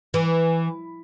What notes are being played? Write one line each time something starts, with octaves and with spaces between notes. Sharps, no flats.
E3